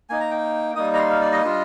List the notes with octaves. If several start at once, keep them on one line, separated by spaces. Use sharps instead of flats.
A#3 D#4 G#5
A#5
G5
G3 A#3 D#4 D#6
A#5
C6
F5
D5
D#5
G3 D4 F4